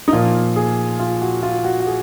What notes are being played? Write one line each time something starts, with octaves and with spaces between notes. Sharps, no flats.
D#4
A#2 F3 A#3 F4
G#4
F4
F#4
F4
F#4
F#4
G#4